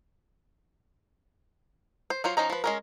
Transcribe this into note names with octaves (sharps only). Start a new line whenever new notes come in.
C5
F#3 F4 C5 C#5
F3 C#4 D#4 A#5
F3 B4
G#3 C#4 A#4